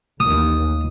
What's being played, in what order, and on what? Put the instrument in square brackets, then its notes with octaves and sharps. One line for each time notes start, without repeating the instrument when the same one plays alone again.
[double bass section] A1 D#2 [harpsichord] D#6